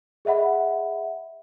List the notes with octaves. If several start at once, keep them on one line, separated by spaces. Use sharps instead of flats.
G#4 D#5 E5 F#5 B5